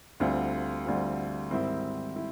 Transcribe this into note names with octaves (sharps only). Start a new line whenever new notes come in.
D2 D3 G3 C4 F4
D2 D3 G3 C4 F4
G#2 D#3 G3 C4 E4
E4